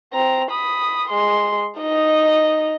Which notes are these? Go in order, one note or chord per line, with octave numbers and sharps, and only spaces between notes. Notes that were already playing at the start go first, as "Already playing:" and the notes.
C4 A#5
B5 D#6
G#3 C6
D#4 D#5